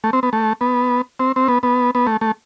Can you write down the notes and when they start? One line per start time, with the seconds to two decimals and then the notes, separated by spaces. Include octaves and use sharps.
0.04 A3
0.13 C4
0.23 B3
0.33 A3
0.61 B3
1.20 C4
1.36 C4
1.48 B3
1.63 B3
1.95 B3
2.07 A3
2.21 A3